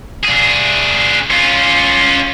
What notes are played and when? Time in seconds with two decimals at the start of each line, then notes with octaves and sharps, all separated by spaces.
0.25 D4 G#4
1.31 C#4 F4